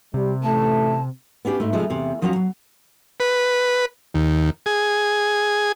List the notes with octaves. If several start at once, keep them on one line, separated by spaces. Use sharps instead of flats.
C3 G3
A1 A3 A5
B3 C#4 D4 G4
G#2 A3
C3 F3 G#3
E2 C3
F2 F3 F#3 C#4 F#5 A#5
F#3
B4
D#2
G#4